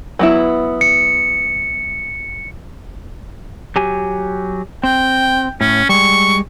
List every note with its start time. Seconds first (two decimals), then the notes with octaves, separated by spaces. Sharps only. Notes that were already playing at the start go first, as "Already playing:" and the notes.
0.19 F#3 B3 E4
0.81 C#7
3.76 F#3 G4 G#5
4.84 C4 G5
5.61 A2 C#4
5.89 G3 G#3 C#6